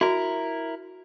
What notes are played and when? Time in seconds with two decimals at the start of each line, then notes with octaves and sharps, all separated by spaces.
0.01 E4 F#4 A#4